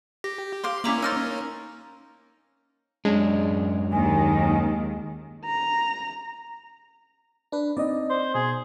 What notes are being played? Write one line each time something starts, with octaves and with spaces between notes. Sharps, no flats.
G4 A#6
C5 F5 C6 D6
A#3 C#4 E4 D5 E5 A#5 D6 F#7
D#4 A#4 C5 E6 F6 A6
F#2 G#3 C#4 D4
D#2 D#3 G#5
A#5
D4 B4
C4 D#4 D5 D#5
C5
B2 G#4